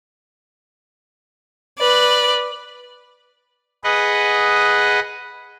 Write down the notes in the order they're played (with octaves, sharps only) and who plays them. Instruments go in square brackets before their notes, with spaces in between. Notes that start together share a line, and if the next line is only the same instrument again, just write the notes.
[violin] B4 D5
[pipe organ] G#4 B4 D#5 F#5